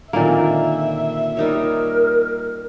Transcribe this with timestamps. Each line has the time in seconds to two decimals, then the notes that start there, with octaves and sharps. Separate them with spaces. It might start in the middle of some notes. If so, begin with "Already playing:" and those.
0.13 A#2 D3 D#3 A#3 C4 E5
1.37 G3 D#4 A#4 C#5